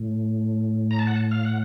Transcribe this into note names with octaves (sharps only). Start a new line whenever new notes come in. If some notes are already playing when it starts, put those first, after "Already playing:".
Already playing: A2
A#5
A5
F#5
A5
F5
F#5